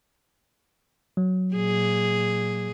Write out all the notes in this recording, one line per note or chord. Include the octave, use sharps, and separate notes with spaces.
F#3
A#2 G#4